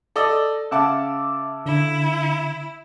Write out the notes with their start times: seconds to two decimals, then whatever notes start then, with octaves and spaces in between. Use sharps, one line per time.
0.16 A4 D5 D#5
0.71 C#3 E5 F#5 A5 D6 E6
1.66 D3 E4